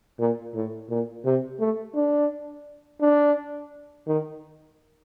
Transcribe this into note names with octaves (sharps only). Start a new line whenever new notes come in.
A#2
A2
A#2
C3
A3
D4
D4
D#3